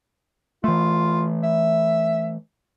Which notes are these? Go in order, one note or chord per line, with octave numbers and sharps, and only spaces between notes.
E3 A3 F4
E5